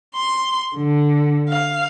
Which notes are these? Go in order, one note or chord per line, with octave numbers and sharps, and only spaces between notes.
C6
D3
F5